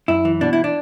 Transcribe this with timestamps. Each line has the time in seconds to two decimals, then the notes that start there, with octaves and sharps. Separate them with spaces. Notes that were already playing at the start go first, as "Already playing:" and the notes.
0.08 F#2 E4
0.25 E3
0.41 B2 D4
0.53 E4
0.64 D4